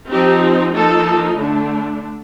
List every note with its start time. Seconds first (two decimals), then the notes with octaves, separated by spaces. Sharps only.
0.11 F3 C4 D#4 G4
0.75 F3 A#3 D#4 A4
1.38 D3 A3 D4